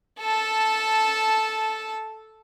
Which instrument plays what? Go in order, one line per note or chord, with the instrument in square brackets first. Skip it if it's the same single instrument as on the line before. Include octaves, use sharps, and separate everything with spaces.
[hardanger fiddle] A4 A5